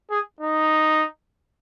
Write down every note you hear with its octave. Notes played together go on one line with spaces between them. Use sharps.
G#4
D#4